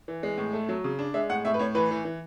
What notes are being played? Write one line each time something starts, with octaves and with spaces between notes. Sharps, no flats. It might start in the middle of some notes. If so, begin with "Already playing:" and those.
E3
G#3
A2
A3
F#3
C#3
D4
G#3 E5
A2 F#5
A2 E5
B4
A2 C#5
E3 B4
E3
E3